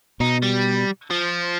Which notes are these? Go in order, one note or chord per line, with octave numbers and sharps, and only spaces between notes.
B2 D#4
G3
F3